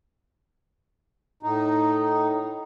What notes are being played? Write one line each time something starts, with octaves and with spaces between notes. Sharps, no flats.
A2 D#4